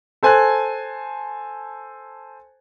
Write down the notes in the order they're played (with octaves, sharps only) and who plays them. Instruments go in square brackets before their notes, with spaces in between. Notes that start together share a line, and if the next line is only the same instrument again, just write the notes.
[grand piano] A4 C5 G#5 A5 F#6 G#6